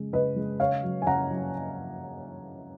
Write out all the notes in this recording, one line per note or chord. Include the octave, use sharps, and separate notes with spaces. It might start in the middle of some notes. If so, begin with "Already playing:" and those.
Already playing: C#3 G#3
C#3 B4 D#5
G#3
C#3 C#5 F5
F#3
G#5
C#3 F#5 A#5
F#3